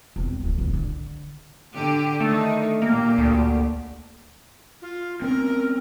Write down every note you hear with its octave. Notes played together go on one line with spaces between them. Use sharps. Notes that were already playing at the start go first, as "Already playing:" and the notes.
E1 C4
D1 E3
D1 A#1
D3
D3 G4
D#3 A3 D4 D#4
A#2 A#3 G4
D2
F4
C4 C#4 A#4